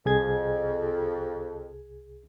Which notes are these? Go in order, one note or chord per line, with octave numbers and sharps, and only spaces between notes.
C2 F2 G#4 G#6